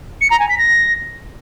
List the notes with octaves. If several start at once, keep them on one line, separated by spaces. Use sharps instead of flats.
C#7
A#5
G#5
B6
A#6